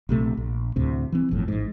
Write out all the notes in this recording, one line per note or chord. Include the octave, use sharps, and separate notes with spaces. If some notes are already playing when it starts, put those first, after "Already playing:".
A#1 C3 A3
A#1
D2 A2 C3
E3 C4
G1 F2 A2
A1 G#2